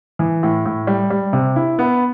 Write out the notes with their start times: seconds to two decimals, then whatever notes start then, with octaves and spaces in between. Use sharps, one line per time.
0.19 E3
0.43 A2
0.66 A2
0.87 G3
1.10 G3
1.33 C3
1.56 E4
1.79 B3